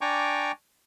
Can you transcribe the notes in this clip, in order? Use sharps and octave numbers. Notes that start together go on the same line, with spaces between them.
D4 G5 G#5 A#5 C#6 D6